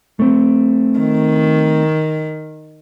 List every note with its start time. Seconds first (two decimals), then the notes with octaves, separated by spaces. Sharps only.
0.20 A3 C4
0.99 D#3